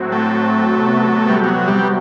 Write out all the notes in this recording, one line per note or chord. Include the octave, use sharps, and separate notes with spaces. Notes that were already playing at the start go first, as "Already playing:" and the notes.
Already playing: A2 F#3 C4 F#4
A3
C3 F#3 B3 F#4
G3
G3
F#3
G3